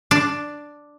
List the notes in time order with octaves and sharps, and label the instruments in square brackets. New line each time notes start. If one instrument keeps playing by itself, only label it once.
[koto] D4